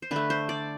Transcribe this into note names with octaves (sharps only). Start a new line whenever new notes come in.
C5
D3 A3 B4
C5
D5